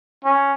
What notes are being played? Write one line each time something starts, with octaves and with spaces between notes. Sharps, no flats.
C#4